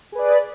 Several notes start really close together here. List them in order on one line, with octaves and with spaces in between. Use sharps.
G#4 B4 D5